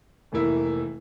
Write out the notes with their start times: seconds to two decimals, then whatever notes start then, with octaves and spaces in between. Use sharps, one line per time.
0.32 F1 E3 A#3 E4